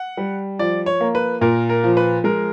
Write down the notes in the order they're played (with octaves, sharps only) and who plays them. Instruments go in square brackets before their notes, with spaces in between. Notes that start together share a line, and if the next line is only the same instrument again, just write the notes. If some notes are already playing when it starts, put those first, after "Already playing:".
Already playing: [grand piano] F#5
[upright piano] G3
[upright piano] F3 [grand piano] D5
[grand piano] C#5
[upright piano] A#3
[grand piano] B4
[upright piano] A#2 [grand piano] A#4
[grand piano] A#4
[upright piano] F3
[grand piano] B4
[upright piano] G#3 [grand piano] A#4